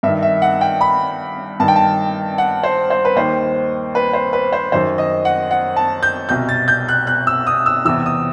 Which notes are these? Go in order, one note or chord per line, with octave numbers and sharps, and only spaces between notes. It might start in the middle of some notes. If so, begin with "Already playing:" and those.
G2 D#3 E5
E5
F#5
G5
B5
G2 D#3 A5
G5
A5
F#5
C5
C5
B4
D#2 D#3 C5
B4
C5
B4
C5
F#2 D#3 C5
D#5
F#5
F#5
A5
G6
C2 B2 G6
A6
G6
F#6
F#6
E6
D#6
E6
E2 C3 E3 E6
D#6